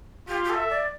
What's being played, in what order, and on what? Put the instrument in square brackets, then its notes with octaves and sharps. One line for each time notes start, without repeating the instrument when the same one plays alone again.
[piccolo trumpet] F4 [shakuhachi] G4
[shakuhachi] G4
A4
[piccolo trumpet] E5
[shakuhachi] D5